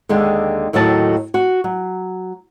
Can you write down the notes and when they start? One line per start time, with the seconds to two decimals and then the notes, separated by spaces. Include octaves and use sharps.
0.09 D#2 D3 G#3 G5
0.73 D#2 A2 D#3 F#3 A4 A5
1.34 F#4
1.64 F#3